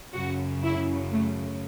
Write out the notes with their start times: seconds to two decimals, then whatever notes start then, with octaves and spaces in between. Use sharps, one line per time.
0.13 F#2 C#3 F#3 F#4
0.62 E4
1.10 A3